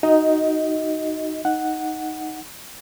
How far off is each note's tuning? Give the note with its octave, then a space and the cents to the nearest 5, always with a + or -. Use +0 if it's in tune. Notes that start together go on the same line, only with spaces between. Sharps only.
D#4 +0 F#4 +15 D#5 +20
D#4 +0 F#5 +0